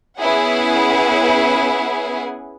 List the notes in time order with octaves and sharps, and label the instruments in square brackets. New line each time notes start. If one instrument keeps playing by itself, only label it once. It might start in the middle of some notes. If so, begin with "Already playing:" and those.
[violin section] B3 C#4 E4 G#4 F#5 G#5